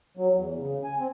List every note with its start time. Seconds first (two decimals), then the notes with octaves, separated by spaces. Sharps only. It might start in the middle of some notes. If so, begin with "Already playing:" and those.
0.17 F#3
0.36 E2
0.58 C#3
0.84 G#5
0.99 C4